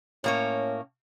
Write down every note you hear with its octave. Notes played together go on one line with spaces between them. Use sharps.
A2 A#3 C#4 C#5